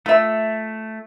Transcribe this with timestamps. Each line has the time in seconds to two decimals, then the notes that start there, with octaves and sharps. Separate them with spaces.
0.06 A3 F4 E5